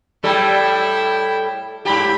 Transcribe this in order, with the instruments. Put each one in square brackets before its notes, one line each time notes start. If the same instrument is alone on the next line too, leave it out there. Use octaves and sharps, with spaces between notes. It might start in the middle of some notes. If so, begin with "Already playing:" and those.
[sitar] A2 G3 A4 [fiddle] E4 G5
[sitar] G#2 G4 [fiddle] B5